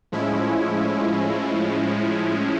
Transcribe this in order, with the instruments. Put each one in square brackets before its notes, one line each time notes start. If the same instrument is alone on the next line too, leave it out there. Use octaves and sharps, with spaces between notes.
[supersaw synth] A2 F3 G#3 C#4 E4